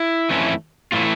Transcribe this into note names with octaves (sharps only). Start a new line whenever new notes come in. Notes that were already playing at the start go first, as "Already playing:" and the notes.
Already playing: E4
F2 E3 A3 C#4 E4
A2 E3 A3 E4 F4